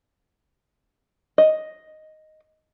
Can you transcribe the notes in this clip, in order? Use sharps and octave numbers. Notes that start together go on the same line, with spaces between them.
D#5